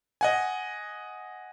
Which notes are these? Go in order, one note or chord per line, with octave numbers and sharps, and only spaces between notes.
D#5 F#5 G#5